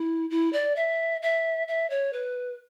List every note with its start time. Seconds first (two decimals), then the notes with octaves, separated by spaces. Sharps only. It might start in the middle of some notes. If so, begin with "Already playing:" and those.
Already playing: E4
0.30 E4
0.53 D5
0.76 E5
1.22 E5
1.68 E5
1.90 C#5
2.13 B4